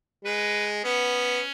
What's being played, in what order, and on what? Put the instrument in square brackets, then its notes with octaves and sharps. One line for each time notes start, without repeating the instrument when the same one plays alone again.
[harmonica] G#3 [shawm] B4
[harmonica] B3 [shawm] C#4